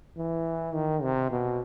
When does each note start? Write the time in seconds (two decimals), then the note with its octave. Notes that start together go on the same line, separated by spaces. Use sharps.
0.18 E3
0.74 D#3
1.02 C3
1.30 B2